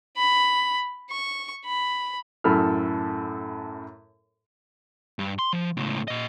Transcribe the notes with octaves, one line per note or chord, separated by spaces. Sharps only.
B5
C#6
B5
F#2 A2 A4 B5 F6
G2
C6
F3
C#2 A2
A#2 D#5